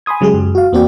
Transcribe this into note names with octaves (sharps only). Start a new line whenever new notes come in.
G#5 B5 C6 D#6 G#6
C#3 F#3 G#3 G4 G#4
F#2
F#4 F5
E2 A#3 C4 F#4 D5 G5